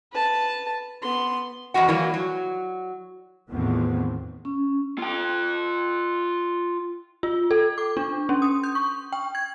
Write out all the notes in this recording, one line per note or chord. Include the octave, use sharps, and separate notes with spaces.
B4 A5
B3 C6
F2 G#2 E3 F#4 F#5
E3 F#3 G3 A#3
F#3
E2 A2 D#3 F3 B3 C4
C#4
F4 G5
F4
A4
D6
D4
C#4
D#6
G6
C#6
G5
G#6